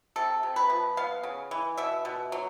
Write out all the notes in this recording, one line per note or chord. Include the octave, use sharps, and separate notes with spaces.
C3 A4
C3
B4
F3
B3 F5
C#3
E3
B2 E5
B2
F#3